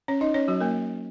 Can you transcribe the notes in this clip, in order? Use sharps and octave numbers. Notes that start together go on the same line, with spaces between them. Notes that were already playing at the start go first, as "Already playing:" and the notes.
C#4 C#5
D#4 D#5
C#4 C#5
F#3 F#4
A#3 A#4